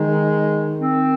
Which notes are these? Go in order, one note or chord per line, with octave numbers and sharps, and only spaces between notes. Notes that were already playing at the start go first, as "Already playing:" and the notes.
Already playing: D#3 G#3
C4